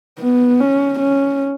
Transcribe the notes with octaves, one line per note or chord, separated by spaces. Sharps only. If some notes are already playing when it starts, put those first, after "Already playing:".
B3
C#4
C#4